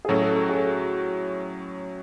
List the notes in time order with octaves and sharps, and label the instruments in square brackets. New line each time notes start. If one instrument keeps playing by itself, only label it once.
[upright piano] G#4
[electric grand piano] A2 F#3 C#4 F#4 [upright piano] A4
[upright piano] A4
A4
G#4